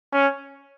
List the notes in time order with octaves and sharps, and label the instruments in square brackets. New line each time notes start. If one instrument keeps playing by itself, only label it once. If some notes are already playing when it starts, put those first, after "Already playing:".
[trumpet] C#4